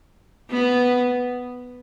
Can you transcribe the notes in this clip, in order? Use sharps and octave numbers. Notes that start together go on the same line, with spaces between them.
B3